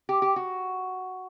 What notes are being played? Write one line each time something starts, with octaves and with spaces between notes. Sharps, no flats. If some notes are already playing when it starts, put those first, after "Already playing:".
G4
G4
F#4